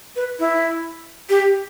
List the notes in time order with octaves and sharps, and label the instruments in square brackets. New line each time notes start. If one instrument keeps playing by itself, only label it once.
[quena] B4
E4
G4